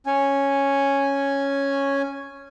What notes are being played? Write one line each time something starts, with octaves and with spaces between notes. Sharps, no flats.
C#4 G#5